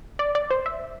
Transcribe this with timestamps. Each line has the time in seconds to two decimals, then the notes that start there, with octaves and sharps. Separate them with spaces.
0.19 D5
0.35 D5
0.50 C5
0.66 E5